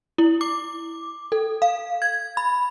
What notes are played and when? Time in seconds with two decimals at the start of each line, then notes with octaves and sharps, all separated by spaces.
0.18 E4
0.41 D6
1.32 A4
1.62 F5
2.02 G#6
2.37 B5